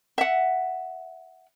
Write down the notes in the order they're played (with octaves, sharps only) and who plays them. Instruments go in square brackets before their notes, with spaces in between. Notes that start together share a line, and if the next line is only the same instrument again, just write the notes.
[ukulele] E5 F#5